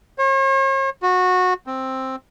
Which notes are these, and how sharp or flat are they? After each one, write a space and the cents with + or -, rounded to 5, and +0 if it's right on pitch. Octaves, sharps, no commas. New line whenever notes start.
C#5 -45
F#4 -20
C4 +5